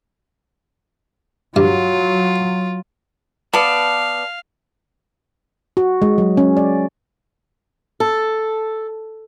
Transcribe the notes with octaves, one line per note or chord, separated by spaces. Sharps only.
G2 F#3 F4
B3 D5 F5 A5
F#4
G#3
F#3
C#4
D5
A4